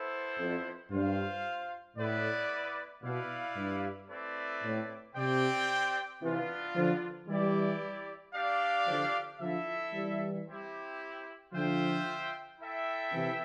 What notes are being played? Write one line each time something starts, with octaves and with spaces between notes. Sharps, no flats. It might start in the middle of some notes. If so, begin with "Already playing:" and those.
Already playing: B3 E4 A4 C5
F2
G2 F4 C5 F5
A2 B3 E4 B4 D5
B2 E4 B4 D5 F5
G2
A3 C4 E4 B4 D5
A2
C3 C4 G4 D5 G5
C3 E3 B3 D4 F4
D3 F3
E3 G3 E4 G4 D5
D4 G4 D5 F5
D3 F3
D3 F3 E4 A4 E5
E3 G3
C4 E4 G4
D3 F3 F4 C5 E5 G5
E4 A4 E5 G5
C3 E3